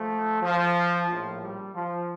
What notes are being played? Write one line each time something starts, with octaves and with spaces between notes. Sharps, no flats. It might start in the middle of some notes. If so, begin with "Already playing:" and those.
Already playing: F3 A3
F3
A#1 A2 F3
G3
F3